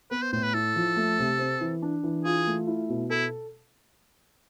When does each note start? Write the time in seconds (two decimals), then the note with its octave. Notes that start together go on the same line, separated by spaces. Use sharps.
0.11 B3 B4
0.22 C5
0.32 A2 C5
0.43 B4
0.53 E4 A4
0.76 F3
0.96 A3
1.19 C3
1.39 C4
1.60 E3
1.82 D4
2.03 E3
2.25 F4 G#4
2.47 A3
2.67 E4
2.89 B2
3.10 E4 A4